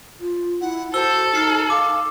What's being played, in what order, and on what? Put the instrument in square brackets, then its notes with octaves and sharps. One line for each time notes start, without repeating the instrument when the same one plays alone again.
[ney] F4
[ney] E4 [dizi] F#5
[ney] F#4 [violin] A4 [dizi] C5 [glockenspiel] E6 G7
[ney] D#4 [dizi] F6 [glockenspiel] C7
[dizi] F5 [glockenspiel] D6